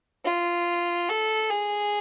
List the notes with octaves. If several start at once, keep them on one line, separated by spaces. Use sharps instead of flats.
F4
A4
G#4